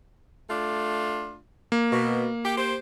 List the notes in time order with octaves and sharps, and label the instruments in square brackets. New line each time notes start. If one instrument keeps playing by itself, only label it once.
[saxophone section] A3 D4 F4
[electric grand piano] A#3
[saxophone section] B2
G4
G4 C5